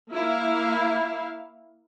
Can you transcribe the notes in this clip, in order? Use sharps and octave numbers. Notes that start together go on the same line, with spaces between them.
A#3 E4 F5